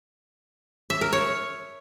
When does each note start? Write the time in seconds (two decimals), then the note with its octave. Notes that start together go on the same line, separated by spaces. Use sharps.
0.90 E5
1.01 A#4
1.13 C#5